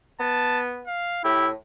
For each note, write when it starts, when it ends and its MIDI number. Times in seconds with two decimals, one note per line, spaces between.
0.20 0.83 59
0.20 0.61 81
0.87 1.22 77
1.24 1.53 45
1.24 1.48 64
1.24 1.49 67